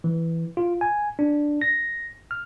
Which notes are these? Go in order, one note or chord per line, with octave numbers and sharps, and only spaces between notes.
E3
F4
G#5
D4
A#6
F6